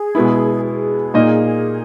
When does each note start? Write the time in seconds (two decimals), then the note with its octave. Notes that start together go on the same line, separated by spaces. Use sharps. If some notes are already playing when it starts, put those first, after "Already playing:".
Already playing: G#4
0.15 B2 G#3 B3 E4
0.64 G#4
1.14 A#2 A#3 D#4 A#4 D#5